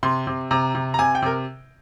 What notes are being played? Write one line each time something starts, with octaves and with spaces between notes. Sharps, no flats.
C3 C6
C3
C3 A#5
C3
A#5
C3 G#5
G5
C3 A#4